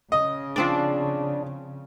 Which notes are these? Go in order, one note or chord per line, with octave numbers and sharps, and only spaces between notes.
C#3 D#5
F3 C4 D4 D5